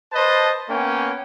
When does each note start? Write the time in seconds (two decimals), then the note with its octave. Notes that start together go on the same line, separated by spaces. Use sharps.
0.13 B4 C5 D#5 A5
0.69 A#3 B3 C#4 G5 G#5